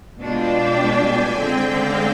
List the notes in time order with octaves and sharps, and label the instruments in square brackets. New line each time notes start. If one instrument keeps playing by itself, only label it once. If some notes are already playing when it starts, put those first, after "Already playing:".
[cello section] B2 G#3 D4 F4 [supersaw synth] G5
[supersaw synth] G#5
[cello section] D3 G#3 C4 [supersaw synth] G5
[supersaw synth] F5